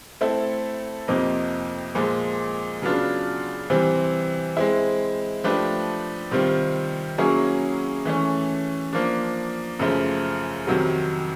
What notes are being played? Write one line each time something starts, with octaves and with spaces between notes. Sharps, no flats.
A3 C4 E4 A4
F2 C3 F3 A#3 D#4
A#2 F3 G#3
C#3 F#3 B3 D4 F4
C3 E3 G3 C4
G#3 C4 E4
F3 A3 D4 G4 B4
C3 D#3 G3 C4 F4
F#3 A#3 C#4 E4 G#4
E3 A3 C#4
F3 A#3 D4
F#2 C#3 F3 A3
F2 C3 D#3 F#3